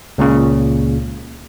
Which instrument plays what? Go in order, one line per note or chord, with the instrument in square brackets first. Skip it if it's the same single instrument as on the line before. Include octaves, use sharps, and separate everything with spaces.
[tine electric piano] C#2 A#2 C#3